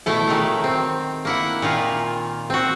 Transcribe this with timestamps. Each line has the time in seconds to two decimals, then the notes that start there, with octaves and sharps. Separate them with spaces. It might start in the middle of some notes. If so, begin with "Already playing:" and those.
0.06 B2 A3 E4 A4
0.27 A#2 D#3 F#3 A4
0.64 C4
1.25 A#3 E4 F#5
1.62 A#2 D#3 F4 G#5
2.50 C4 F#4